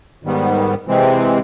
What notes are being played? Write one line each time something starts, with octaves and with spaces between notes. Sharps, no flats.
G#2 D#3 G3 B3
C3 E3 G#3 C4